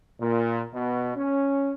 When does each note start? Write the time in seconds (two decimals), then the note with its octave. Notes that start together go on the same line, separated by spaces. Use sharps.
0.19 A#2
0.73 B2
1.16 C#4